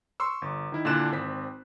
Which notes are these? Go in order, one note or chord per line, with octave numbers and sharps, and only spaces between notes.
C6 C#6 E6
G1
D#3 E4
A#2 D3 D4 E4 F#6 E7
G#1 C4 B6